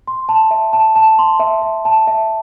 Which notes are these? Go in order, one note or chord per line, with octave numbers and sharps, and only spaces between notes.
C6
A5
E5
A5
A5
C6
E5
E5
A5
E5